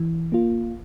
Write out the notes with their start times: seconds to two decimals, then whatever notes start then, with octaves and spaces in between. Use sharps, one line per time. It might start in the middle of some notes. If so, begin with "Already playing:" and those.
Already playing: E3
0.32 A#3 F4